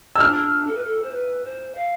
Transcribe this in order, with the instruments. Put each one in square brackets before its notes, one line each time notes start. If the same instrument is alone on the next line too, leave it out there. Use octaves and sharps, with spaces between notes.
[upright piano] E6
[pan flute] D4 [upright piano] F6
[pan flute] A4
B4
A4
C5
B4
C5
F5